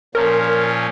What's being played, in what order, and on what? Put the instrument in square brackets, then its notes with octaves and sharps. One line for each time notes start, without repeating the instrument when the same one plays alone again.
[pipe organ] A#2 F3 C#4 [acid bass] A#4